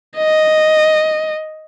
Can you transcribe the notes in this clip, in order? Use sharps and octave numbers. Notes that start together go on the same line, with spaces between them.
D#5